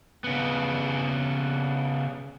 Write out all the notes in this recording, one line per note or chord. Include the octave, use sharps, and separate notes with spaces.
C#3 B3